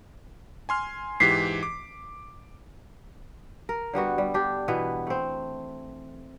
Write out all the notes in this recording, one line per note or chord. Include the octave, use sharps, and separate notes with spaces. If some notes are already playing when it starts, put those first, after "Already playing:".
G#5 C6 F6
G#2 E3 G4 B6 C7
D6
A#4
D3 G3 B3 F#4
G3
D4 G4
B2 E3 B3
A3 C4